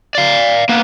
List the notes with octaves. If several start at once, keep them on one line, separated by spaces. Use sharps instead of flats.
D5 F5
A#3 B3